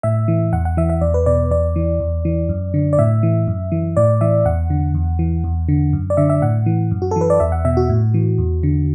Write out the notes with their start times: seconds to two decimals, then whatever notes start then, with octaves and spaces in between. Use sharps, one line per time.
0.03 A2 E5
0.28 E3
0.53 E2 F#5
0.65 F#5
0.77 E3 E5
0.90 E5
1.01 E2 D5
1.14 B4
1.26 B2 D5
1.51 E2 D5
1.76 E3
2.00 E2
2.25 E3
2.49 F#2
2.74 D3
2.93 D5
2.98 A2 E5
3.23 E3
3.48 F#2
3.72 E3
3.97 A2 D5
4.21 E3 E5
4.45 E2 F#5
4.70 D3
4.94 E2
5.19 E3
5.44 E2
5.69 D3
5.93 F#2
6.10 D5
6.17 D3 E5
6.30 E5
6.42 A2 F#5
6.66 E3
6.91 F#2
7.02 F#4
7.11 A4
7.16 E3
7.21 B4
7.30 D5
7.40 E2 E5
7.52 F#5
7.65 B2 E5
7.77 F#4
7.89 A2
8.14 E3
8.38 E2
8.63 D3